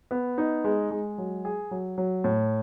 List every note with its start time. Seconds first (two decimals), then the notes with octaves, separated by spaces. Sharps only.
0.11 B3
0.38 D#4
0.64 G#3
0.91 G#3
1.18 F#3
1.45 G#4
1.71 F#3
1.98 F#3
2.24 A2